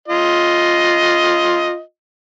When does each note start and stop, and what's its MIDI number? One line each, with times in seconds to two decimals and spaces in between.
0.08 1.80 65
0.08 1.80 75